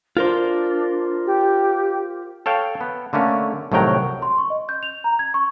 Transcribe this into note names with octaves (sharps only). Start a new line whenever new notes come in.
D4 F4 A#4 C5
G4
A4 C#5 F5 G5
B3
D3 A3 A#3 C#4
C2 A2 D#3 F#3 G5 A#5
C6
C#6
D#5
G6
F7
A#5
G#6
C#6